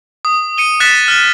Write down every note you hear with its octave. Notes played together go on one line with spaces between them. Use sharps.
D#6
C#7 D#7 G7
D#6 F#6 A6 B6 C#7 E7
F6 A6